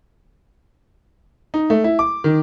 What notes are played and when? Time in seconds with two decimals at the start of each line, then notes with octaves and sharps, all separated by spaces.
1.54 D#4
1.70 A3
1.84 E4
1.99 D6
2.24 D#3